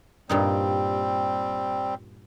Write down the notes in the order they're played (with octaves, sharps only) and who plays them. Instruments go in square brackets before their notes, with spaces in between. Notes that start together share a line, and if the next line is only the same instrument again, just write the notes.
[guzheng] G2 A#2 D#4 [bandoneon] G3 C4